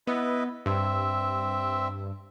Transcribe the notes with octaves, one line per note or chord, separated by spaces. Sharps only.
B3 E4 B4 D#5
G2 C4 E5